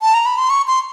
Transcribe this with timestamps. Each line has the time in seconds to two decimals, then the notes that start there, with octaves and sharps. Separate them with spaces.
0.01 A5
0.14 A#5
0.26 B5
0.38 C6
0.50 C#6
0.67 C6